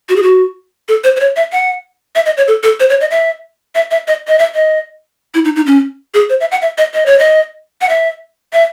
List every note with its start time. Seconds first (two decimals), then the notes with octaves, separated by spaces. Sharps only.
0.09 F#4
0.16 G#4
0.23 F#4
0.88 A4
1.04 C5
1.16 C5
1.20 C#5
1.36 E5
1.52 F#5
2.15 E5
2.26 D#5
2.37 C#5
2.48 A4
2.63 A4
2.80 C5
2.90 C#5
3.01 D#5
3.11 E5
3.75 E5
3.91 E5
4.08 D#5
4.28 D#5
4.39 E5
4.55 D#5
5.34 E4
5.45 D#4
5.56 D#4
5.67 C#4
6.14 G#4
6.29 C5
6.40 E5
6.52 F#5
6.62 E5
6.78 D#5
6.94 D#5
7.06 C#5
7.19 D#5
7.81 F#5
7.89 E5
8.53 E5